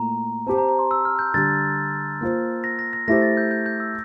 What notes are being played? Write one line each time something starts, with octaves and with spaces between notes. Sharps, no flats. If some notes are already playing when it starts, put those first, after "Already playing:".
Already playing: A#2 A3 E4 A#5
C4 G4 C5 A5
A#5
A#5
C6
E6
F6
G6
D3 G3 D4 A6
A#3 F4 C5
A#6
A#6
A#6
A3 E4 G4 C5 A#6
A6
G6
G6
G6
E6